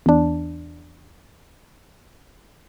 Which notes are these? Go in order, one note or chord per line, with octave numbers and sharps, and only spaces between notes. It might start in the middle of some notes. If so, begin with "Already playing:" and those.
E2 D4